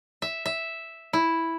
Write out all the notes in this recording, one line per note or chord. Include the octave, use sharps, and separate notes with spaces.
E5
E5
E4